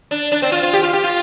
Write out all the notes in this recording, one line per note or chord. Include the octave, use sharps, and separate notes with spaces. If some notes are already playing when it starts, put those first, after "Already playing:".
D4
D4
C4
F4
F4
G4
F4
G4
F4